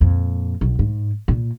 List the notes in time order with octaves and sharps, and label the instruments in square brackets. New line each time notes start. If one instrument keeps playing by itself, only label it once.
[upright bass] F2 A#2
B1
G#2
A#2